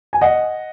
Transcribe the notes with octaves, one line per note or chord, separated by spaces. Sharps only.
G#5
D#5 F#5